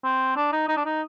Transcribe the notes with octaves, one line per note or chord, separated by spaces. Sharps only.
C4
D4
D#4
D#4
D4
D#4